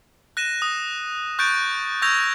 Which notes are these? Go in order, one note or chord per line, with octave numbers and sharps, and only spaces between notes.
F#6 A#6 D#7 E7
D#6
C#6 F#6 G6 A6 D7
C#6 E6 G6 G#6 A#6 F7